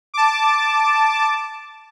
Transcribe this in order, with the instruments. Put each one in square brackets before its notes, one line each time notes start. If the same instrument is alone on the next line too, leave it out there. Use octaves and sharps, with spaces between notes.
[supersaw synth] A5 D6